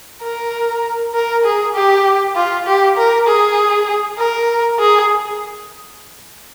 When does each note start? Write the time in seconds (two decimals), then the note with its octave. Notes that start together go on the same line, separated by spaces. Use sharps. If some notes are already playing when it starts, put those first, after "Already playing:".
0.23 A#4
1.14 A#4
1.44 G#4
1.75 G4
2.35 F4
2.67 G4
2.97 A#4
3.27 G#4
4.18 A#4
4.79 G#4